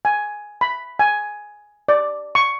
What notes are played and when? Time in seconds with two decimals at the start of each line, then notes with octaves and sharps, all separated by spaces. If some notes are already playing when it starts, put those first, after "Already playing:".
0.05 G#5
0.61 B5
0.99 G#5
1.88 D5
2.35 C#6